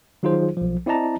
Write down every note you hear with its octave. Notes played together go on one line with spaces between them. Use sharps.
D#3 F#3 D#4 F4 G#4 C5
B1 F3
C4 E4 D5 D#5 A5 A#5